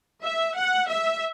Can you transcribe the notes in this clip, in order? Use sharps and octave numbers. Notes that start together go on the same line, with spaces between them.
E5
F#5
E5